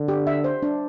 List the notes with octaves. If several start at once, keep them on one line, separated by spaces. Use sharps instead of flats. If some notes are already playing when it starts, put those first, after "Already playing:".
Already playing: D3
G4
E5
C5
D4